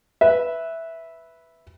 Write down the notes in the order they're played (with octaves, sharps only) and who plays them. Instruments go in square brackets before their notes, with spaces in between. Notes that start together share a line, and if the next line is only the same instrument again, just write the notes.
[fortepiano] B4 E5